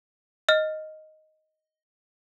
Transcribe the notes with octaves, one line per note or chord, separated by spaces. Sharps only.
D#5 F6